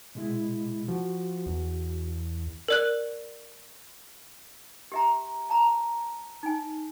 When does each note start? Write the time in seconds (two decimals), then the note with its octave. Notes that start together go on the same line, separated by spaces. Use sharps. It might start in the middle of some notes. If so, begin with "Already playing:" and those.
0.15 B2 G#3 E4
0.88 F3 F#4
1.46 E2
2.68 A#4 D5 F#6
4.92 G4 E5 A#5
5.50 A5 A#5
6.43 D#4 G#5